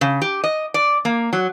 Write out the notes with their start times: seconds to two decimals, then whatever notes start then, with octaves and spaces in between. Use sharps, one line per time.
0.01 C#3
0.22 G4
0.44 D#5
0.74 D5
1.05 A#3
1.33 F#3